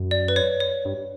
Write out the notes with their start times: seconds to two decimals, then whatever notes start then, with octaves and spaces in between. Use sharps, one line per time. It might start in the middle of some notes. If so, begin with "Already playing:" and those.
Already playing: F#2
0.11 D5
0.28 B4
0.36 C#5
0.60 C#5
0.85 G2